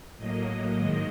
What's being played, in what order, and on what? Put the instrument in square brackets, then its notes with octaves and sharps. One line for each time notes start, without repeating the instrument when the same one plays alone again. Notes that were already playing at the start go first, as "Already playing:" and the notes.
[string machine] A2 F#3 A#3 D#5
G#2 D#3 G#3 D#5